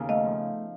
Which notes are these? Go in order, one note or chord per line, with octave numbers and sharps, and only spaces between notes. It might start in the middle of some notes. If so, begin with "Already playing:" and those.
Already playing: D#2 C#3 B3
A3 D#5 F5
F3